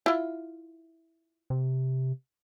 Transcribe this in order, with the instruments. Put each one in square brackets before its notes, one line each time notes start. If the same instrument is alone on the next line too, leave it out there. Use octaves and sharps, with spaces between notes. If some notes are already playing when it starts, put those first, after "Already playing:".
[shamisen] E4 F4
[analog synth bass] C3